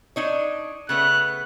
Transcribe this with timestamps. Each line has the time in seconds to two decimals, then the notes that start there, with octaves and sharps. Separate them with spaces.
0.16 D4 D#4 C#5
0.89 C#3 A3 B3 F#6